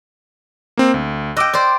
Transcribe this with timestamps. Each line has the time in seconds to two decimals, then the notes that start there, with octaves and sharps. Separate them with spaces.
0.77 A#3 C4
0.94 D2
1.37 D#5 G5 D6 E6 F#6
1.54 C5 D5